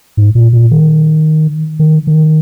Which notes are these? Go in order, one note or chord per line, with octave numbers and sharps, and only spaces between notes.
G#2
A#2
A#2
D#3
D#3
D#3